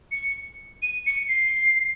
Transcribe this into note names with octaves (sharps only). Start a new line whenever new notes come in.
C#7
D#7
C#7
C7